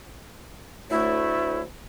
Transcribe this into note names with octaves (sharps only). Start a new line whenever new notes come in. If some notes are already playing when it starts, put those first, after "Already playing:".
D2 A2 A3 E4